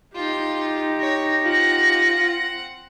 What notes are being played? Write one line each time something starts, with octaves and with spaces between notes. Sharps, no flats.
D#4 F4 G4
C#5 A#6
C4 F4 F#5